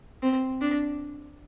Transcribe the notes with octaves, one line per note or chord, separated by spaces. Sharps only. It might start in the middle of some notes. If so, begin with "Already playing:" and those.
C4
D4